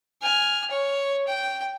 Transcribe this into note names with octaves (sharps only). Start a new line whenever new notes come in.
G#5 F6
C#5
G5